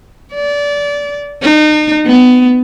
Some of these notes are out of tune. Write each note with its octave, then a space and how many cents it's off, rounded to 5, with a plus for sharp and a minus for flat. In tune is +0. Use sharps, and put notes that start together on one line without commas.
D5 -25
D#4 -35
B3 +20